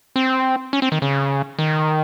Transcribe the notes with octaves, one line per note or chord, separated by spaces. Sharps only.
C4
C#4
C4
D#3
C#3
D#3